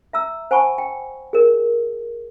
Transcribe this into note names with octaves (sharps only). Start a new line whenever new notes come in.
E5 A#5 E6
C5 F#5 G#5 A5 B5 C#6
G5
G#4 A#4 D5